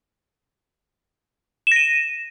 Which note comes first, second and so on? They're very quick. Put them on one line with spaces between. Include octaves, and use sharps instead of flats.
E7 A#6 D#7